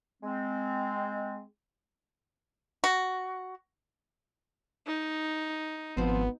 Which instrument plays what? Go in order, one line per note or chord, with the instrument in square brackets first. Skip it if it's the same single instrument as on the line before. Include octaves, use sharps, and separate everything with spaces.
[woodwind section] G#3 C4
[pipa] F#4
[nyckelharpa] D#4
[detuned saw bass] G#1 [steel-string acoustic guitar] F3 C4 [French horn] B3